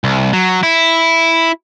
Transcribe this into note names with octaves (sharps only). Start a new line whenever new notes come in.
C2
F#3
E4